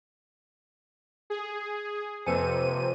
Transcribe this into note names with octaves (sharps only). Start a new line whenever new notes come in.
G#4
F2 C3 A#3 B4 C5 G#5 D#7